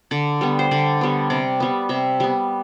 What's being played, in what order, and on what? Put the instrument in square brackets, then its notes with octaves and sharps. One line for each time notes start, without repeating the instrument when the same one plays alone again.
[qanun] D3 D5
G3 B3
C5
D3 D5
G3 B3
C3 D5
G3 B3
C3 E5
G3 B3